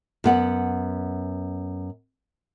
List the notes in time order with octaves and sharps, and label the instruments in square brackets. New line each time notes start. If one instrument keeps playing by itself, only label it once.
[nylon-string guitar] F#2 B3 F#5